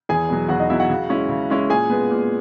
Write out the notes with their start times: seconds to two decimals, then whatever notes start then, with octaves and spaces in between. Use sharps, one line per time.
0.09 E2 G#4 G#5
0.29 B2 F#3
0.49 E2 F#4 F#5
0.59 D#4 D#5
0.70 B2 F#3 E4 E5
0.80 F#4 F#5
0.89 C#3
1.09 G#3 C#4 E4
1.29 C#3
1.50 G#3 C#4 E4
1.70 A#2 G#4 G#5
1.90 G#3 B3
2.10 A#2